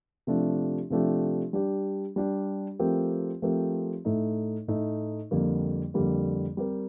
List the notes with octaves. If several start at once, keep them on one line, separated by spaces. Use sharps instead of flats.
C3 F3 A3 D4 G4
C3 F3 A3 D4 G4
G3 D4 G4
G3 D4 G4
F3 A3 C4 G4 A#4
F3 A3 C4 G4 A#4
A2 A3 D#4
A2 A3 D#4
F2 D3 G3 A#3
F2 D3 G3 A#3
G3 C4 G4 A#4